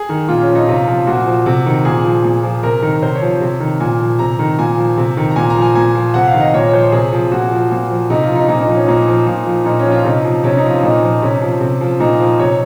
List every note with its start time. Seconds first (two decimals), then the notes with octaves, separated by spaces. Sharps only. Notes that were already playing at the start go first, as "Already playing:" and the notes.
Already playing: G#4
0.09 D#3
0.28 A#2 F4
0.41 C#4
0.49 F3
0.55 D#4
0.68 C3 F4
0.87 F3
1.07 A#2 F#4
1.27 F3
1.46 C3
1.66 D#3
1.85 A#2 G#4
2.04 F3
2.24 A#2
2.43 F3
2.63 C3 A#4
2.82 D#3
3.02 C3 C5
3.15 C#5
3.22 F3
3.41 C3
3.60 D#3
3.80 A#2 G#5
4.00 F3
4.19 C3 A#5
4.39 D#3
4.58 A#2 G#5
4.78 F3
4.97 C3
5.17 D#3
5.31 A#5
5.36 A#2 G#5
5.50 A#5
5.56 F3
5.62 G#5
5.75 A#2 G#5
5.95 F3
6.14 C3 F#5
6.27 F5
6.34 D#3
6.40 D#5
6.54 A#2 C#5
6.69 C#5
6.73 F3 C5
6.92 C3 G#4
7.13 F3
7.32 A#2 F#4
7.51 F3
7.71 A#2
7.91 F3
8.10 C3 D#4
8.23 F4
8.30 F3
8.36 D#4
8.48 A#2 D#4
8.61 D#4
8.68 F3
8.75 C#4
8.88 A#2 D#4
9.08 F3
9.27 A#2
9.47 F3
9.66 A#2 D#4
9.79 C#4
9.86 F3
9.91 F4
10.05 C3 D#4
10.24 F3
10.44 C3 C#4
10.57 D#4
10.64 F3
10.70 F4
10.83 A#2 D#4
11.03 F3
11.22 C3 C#4
11.42 F3
11.61 C3
11.81 F3
12.00 A#2 D#4
12.20 F3
12.39 C3 C#5